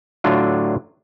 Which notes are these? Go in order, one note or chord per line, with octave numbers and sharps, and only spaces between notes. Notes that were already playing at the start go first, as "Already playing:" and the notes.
A2 D3 F#3 D4 F4